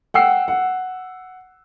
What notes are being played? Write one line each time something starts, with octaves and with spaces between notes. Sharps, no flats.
F#5 G5 E6 C7
F#5